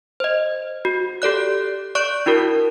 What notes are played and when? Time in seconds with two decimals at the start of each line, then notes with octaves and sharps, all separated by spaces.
0.20 C5 D#5
0.85 F#4
1.22 G4 A4 D5 F#6
1.95 D5 C#6 F#6 D7
2.26 D4 E4 F#4 A#4